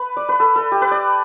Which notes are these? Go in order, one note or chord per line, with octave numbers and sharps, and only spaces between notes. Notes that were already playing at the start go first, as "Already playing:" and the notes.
Already playing: B4
D5
B4
A4
A4
G4
B4
D5